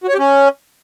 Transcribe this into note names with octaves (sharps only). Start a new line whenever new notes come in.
F#4
C#5
G4
C#4